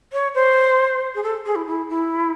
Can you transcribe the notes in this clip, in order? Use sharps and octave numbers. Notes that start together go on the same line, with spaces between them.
C#5
C5
G#4
A4
G#4
E4
E4
E4